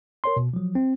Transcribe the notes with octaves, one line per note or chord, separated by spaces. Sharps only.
A#4 C#5 C6
B2
F3 F#3
C4